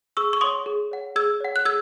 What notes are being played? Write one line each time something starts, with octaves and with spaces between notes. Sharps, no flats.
G#4 C#6 E6
C#6
C#5 F#5 C6 D#6
G#4
C#5 F#5
G#4 E6 G#6
C#5 F#5
F#6
G#4 E6 G#6